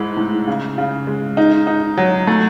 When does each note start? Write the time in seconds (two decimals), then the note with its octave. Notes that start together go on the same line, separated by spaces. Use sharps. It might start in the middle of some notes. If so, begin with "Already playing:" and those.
Already playing: G#2 G#3 E4
0.17 A2
0.47 C#3
0.78 C#3
1.07 G#3
1.37 D#4
1.67 D#4
1.97 F#3
2.27 A3